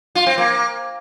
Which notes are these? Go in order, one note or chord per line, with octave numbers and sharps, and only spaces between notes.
F4
C4
A#3